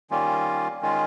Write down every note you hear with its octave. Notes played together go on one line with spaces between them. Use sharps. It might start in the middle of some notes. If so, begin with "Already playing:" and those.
D#3 G3 A#3 C#4 F4
D#3 G#3 C#4 F4